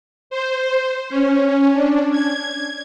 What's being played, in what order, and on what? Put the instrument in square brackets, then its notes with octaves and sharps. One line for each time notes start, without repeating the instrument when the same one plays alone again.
[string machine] C5
C#4
D4
G#6